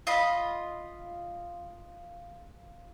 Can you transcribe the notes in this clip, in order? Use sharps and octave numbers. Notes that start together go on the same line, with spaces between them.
F4 D#5 B5